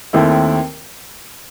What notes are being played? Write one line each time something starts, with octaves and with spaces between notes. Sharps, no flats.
D#2 D#3 A3 C4 E4